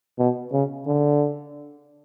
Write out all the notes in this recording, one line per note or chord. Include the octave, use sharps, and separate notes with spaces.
B2
C#3
D3